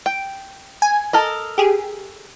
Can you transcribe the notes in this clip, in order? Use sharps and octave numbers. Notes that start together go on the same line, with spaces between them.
G5
G#5
A4 A#4 D#5
G4 G#4